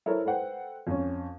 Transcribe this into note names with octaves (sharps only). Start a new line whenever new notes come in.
E4 A4 A#4 C5 C#5
A4 B4 C5 F#5 G5
F2 C#4